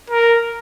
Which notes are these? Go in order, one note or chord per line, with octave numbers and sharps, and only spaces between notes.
A#4